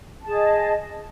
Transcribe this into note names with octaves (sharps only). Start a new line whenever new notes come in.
G#4 D#5 A5